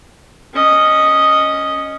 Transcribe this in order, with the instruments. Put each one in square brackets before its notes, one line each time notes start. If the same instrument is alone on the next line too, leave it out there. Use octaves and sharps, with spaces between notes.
[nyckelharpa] C#4 D#5